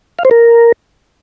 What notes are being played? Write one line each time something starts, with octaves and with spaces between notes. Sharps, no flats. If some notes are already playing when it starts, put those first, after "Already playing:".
F5
C5
A#4